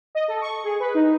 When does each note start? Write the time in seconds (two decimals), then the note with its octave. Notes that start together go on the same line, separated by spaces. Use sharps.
0.15 D#5
0.28 A4
0.41 C#6
0.64 G#4
0.80 B4
0.95 D#4